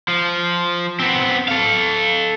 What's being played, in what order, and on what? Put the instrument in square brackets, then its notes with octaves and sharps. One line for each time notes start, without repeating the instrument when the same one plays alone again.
[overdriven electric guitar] F3
B3 C4
A4 F5